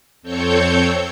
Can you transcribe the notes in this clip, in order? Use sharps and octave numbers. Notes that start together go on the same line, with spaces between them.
F2 C4 A4 C#5 G6 C#7